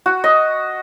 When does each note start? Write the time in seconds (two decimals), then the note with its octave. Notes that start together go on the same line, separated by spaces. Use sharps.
0.06 F#4
0.24 D#5